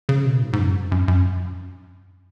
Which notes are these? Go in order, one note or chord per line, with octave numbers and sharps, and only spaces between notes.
C#3
B2
G#2
G#2
F#2
F#2
F#2